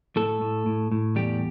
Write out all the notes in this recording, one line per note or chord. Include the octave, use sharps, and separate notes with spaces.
A2 A3 A4
A2
A2
A2
E2 G3 G4